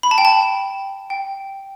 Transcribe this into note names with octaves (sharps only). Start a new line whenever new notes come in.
B5
A5
G5
A5
G5